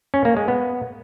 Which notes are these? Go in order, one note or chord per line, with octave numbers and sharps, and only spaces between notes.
C#4
A#3
G#3
B3